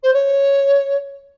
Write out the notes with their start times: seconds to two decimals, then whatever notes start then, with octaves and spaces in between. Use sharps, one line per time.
0.03 C5
0.13 C#5